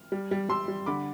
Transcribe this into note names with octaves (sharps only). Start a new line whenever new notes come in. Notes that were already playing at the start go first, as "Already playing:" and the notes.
Already playing: F6
G3
G3
G3 C6 E6
G3
D3 B5 D6